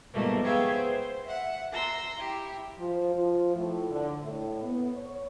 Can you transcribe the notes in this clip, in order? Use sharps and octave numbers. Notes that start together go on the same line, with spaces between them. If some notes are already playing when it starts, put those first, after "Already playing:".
G#2 B2 F3 G3 A3 A#3
B3 G#4 C#5 E5 F5 G5
C5
E5 F#5
A#5 C6 E6
E4 G4
F3
F3
A2
D3
A2
B3
C#5